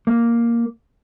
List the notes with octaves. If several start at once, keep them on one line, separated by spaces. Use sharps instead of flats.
A#3